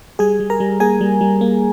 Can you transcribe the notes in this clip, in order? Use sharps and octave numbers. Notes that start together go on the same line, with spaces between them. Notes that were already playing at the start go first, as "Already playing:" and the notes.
G3 G#4 G#5
G3
A#4 A#5
G3
A#3 G#4 G#5
G3
G3
A#3